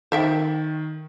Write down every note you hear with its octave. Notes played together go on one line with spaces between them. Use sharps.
D#3 C5 E5 G5